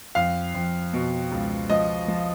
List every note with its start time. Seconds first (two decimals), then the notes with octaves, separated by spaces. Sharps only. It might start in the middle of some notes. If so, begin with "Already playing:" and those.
0.15 F2 F5
0.54 F2
0.93 B2
1.31 C#2
1.70 F3 D#5
2.08 F3